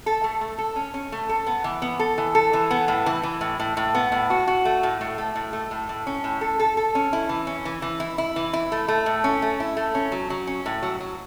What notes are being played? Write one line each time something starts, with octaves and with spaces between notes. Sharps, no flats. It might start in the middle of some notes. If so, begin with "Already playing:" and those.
A4
A3
A3
A4
C#4
C#4
A3
A4
B3
E3
B3
A4
E3
A4
E3
B3
A2
E3
E3
A2
A2
A2
B3
A2
F#4
F#4
A3
A2
A2
A3
A2
A3
A2
A2
C#4
A2
A4
A4
A4
C#4
E4
E3
C#4
E3
E3
E4
E4
E3
E4
A3
A3
A2
C#4
A3
E4
A3
C#4
F#3
F#3
C#4
A2
F#3
F#3